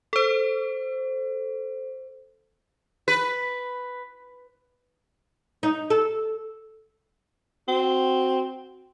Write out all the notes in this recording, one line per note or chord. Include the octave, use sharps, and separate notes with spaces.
A4 C5
B4
D#4
A4
C4 F#4